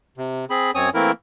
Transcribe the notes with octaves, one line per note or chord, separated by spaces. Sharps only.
C3
C4 G#4 B5
F#2 C4 C#5 G#5 D#6
E3 A3 A#3 C4 E4 A#4